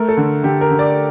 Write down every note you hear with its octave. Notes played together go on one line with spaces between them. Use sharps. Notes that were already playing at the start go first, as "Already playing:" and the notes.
Already playing: A3 A#4
A4
D3
D3 G4
A#4
D3
D5